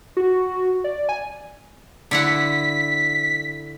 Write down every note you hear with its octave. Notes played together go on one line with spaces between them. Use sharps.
F#4
D5
G#5
D3 E4 F#5 B6